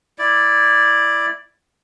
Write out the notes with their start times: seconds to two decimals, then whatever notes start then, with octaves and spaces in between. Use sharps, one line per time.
0.18 E4 D5